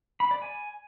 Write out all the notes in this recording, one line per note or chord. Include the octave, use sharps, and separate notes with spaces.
B5
D5
G#5